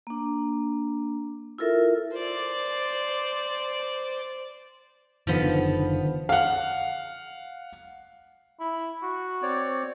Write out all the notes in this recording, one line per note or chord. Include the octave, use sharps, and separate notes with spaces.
A#3 D4
E4 F4 A4 A#4 E5
C5 D5
F#1 D3 D#3 F3 B3
F5 F#5
E4
F#4
C4 C#5 D5